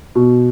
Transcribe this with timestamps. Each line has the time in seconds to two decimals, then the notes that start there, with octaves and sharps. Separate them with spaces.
0.15 B2